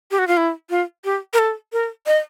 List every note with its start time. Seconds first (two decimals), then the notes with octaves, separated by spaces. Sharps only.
0.11 G4
0.19 F#4
0.28 F4
0.37 E4
0.70 F4
1.05 G4
1.33 A#4
1.39 A4
1.73 A#4
2.07 D#5